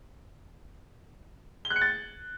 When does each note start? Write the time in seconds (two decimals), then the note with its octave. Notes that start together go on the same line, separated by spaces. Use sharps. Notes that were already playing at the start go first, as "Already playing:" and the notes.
1.65 G7
1.70 F#6
1.76 C#7
1.81 A6